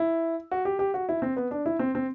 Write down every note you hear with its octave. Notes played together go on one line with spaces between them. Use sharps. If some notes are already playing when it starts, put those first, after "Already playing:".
Already playing: E4
F#4
G4
G4
F#4
E4
C4
B3
D4
E4
C4
C4